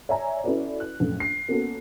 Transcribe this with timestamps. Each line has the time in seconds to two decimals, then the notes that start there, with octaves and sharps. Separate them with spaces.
0.09 C#5 D5 E5 G#5 A#5
0.44 C#4 E4 F#4 A4 B4 D5
0.80 F#6
1.00 A#1 F#2 A3
1.20 C7
1.48 A#3 B3 C#4 F#4 A4